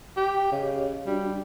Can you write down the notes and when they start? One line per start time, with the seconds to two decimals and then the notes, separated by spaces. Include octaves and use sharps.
0.17 G4
0.52 C#3 G4 C#5 D#5
1.07 G3 D4 F#4